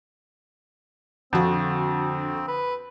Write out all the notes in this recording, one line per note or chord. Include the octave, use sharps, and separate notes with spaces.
F2 D3 C4 F#4
B4